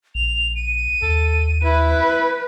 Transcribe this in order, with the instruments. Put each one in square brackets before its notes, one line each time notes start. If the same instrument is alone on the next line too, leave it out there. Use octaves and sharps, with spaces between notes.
[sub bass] A#1 [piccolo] F7
[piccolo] D#7
[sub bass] D#2 [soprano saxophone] A4
[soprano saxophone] E4 [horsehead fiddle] B4